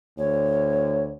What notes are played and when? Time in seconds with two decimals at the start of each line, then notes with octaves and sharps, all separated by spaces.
0.18 D2 C#5